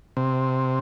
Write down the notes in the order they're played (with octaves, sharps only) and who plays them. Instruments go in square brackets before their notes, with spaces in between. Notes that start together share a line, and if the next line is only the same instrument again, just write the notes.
[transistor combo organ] C3